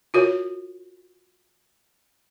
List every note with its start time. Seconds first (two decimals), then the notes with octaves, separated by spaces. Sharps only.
0.14 F4 F#4 A#4 C#5